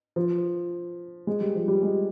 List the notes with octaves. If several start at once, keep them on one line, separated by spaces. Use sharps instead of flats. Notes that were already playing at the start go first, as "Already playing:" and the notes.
F3
G#3
G3
F3
G3
G#3